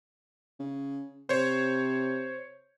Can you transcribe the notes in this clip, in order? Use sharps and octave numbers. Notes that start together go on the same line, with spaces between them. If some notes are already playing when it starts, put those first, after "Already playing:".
C#3
C3 C5 C#5